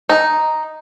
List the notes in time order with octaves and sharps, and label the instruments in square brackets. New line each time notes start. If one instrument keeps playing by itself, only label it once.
[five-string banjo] D#4